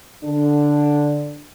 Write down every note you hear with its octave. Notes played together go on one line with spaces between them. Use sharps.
D3 D4